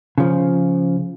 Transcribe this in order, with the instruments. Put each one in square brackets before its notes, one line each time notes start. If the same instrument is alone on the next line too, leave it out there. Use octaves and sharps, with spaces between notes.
[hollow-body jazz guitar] C#3 F3